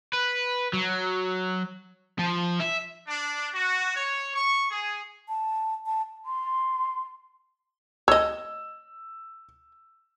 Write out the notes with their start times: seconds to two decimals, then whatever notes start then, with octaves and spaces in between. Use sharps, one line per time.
0.13 B4
0.73 F#3
2.19 F3
2.60 E5
3.07 D4
3.53 F#4
3.96 C#5
4.34 C#6
4.71 G#4
5.29 A5
5.86 A5
6.25 C6
8.08 C#5 D#5 E6